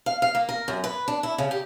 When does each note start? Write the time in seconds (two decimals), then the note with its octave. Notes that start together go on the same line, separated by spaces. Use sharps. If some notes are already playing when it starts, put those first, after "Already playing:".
0.06 F5
0.22 F5
0.35 A#3
0.49 A#4
0.68 F#2
0.84 B4
1.08 D4
1.23 E4
1.38 C#3
1.51 G4